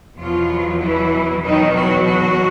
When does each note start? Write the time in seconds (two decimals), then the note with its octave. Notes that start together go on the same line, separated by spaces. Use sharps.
0.16 E2 B2 F3 F#3 F4
0.80 E3 E4
1.42 E2 B2 D#3 F#3 D#4
1.74 F#3 F#4
2.05 F#3 F#4